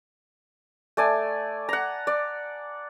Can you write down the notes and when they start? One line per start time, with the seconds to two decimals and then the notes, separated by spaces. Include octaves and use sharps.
0.97 A3 D5 G#5
1.69 F#5 A#5
2.07 D5